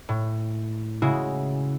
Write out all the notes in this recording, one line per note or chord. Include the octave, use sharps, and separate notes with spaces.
A2
C#3 G#3 E4 F#4